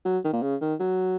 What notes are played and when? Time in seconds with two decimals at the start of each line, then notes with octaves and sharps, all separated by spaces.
0.05 F#3
0.24 D#3
0.33 A#2
0.42 C#3
0.61 D#3
0.80 F#3